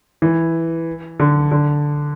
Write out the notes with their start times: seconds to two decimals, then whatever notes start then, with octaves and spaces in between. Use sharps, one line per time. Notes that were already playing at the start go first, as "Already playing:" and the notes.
0.22 E3
1.20 D3
1.52 D3